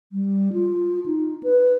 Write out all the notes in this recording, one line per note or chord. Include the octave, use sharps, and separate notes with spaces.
G3
F4
D#4
B4